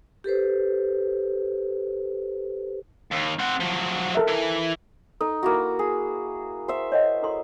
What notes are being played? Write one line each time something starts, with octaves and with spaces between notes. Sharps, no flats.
G4 A4 B4 C5
D#2
C4 F#5
F3 F#3
A4 A#4 E5
E3
D#4 A4
A#3 E4 F#4
G#4
C5 E5 F#5
C#5 D#5 F#5
E4 A4 C6